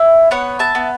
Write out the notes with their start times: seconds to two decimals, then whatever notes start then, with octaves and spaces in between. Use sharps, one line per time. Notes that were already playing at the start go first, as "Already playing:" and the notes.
Already playing: E4
0.31 B3 C#5 F#5
0.59 E5 A5
0.75 B3